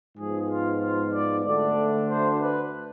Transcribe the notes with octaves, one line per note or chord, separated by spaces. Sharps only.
G#2 F3 B3 G#4
F4
F4
D5
D2 D3 A3 D4 D5
C5
B4